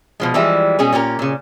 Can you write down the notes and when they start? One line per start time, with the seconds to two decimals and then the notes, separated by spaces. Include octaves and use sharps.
0.20 B2 F3 G#3
0.34 E3 F3 G3 G#3 E4
0.79 B2 G#3 C#4 G#4
0.92 A#2 C#4 G4 A#4
1.19 A#2 C#3